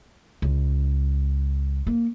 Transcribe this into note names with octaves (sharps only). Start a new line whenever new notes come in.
C#2
A#3